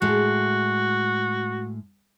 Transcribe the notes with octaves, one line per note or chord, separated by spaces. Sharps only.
A2 G#3 F#4